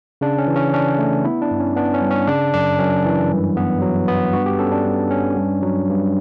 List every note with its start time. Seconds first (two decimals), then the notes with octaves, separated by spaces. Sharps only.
0.21 C#3 D4
0.38 C#4
0.47 E3
0.56 C#4
0.73 C#4 D4
0.98 A3
1.25 B3 E4
1.42 D4
1.51 G2
1.59 C#4
1.76 B3 D4
1.94 C#4
2.01 G2
2.10 C#4
2.27 C#3 D4
2.53 F#2 D4
2.79 F#2 C#4
3.05 E3
3.31 G2
3.57 B3
3.82 F#3
4.08 B3
4.33 G2 F#4
4.46 G4
4.59 C#4 A4
4.72 D4
4.85 G2
5.11 C#4
5.36 G2
5.63 F#3
5.89 G2